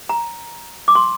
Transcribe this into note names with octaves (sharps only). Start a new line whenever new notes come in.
A#5
D6
C6